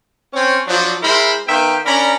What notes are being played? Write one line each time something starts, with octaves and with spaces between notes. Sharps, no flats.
C4 C#4 C#5
F3 F#3 D4
G#3 E4 A#4 C5 B5 C6
D#3 B3 E5 F5 G5
C#4 D4 A#4 D5 A#5 B5